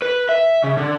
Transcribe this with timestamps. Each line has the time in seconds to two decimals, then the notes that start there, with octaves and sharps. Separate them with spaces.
0.02 B4
0.29 E5
0.64 C#3
0.77 D3